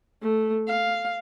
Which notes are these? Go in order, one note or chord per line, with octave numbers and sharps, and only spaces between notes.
A3
F5